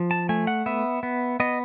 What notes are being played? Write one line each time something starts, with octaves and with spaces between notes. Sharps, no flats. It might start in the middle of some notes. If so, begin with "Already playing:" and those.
Already playing: F3
A5
A3 G#5
F#5
B3 E5
B3
B3 D#5